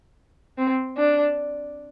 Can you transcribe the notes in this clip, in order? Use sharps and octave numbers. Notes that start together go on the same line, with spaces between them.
C4
D4